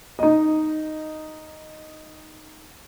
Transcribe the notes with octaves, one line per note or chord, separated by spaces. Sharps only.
D#4 D#5